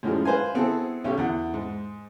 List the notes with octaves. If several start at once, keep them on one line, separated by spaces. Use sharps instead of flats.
F#2 A2 F3 G3 G#3
B4 C5 F5 G#5
B3 C4 E4 G#4 A4
B1 C#4 G4
E2 F#5
G#2